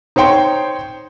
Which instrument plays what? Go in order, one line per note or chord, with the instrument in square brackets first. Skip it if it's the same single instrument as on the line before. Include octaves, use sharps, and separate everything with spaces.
[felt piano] D#4 C5 C#5 G5 C6